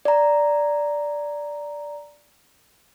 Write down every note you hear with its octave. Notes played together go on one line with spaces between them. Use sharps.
D5 A#5